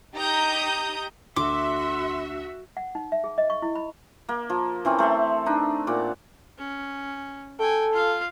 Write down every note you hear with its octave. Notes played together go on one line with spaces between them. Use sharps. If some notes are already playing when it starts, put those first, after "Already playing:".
D#4 G4 A#5 D#6 G6
D2 F#4 E5 C6 D6
F#5
D#4
E5
G#4
D#5
C#6
E4
B5
A#3
F3
E3 C4 C#4
A3 C5 E5 A5
D4 D#4
A#2 F#5 D6
C#4
A4 G5 G#5
F4 F5